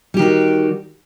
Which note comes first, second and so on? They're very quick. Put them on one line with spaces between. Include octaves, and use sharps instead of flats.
G3 G4 D#3 F#4